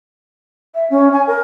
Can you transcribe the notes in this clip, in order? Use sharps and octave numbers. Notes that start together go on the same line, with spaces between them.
E5
C#4
G#5
A#4